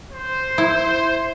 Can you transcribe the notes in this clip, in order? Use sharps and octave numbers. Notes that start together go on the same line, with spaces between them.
C5
E4